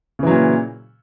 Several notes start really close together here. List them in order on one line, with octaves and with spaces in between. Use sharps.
C#3 E3 F#3 A#2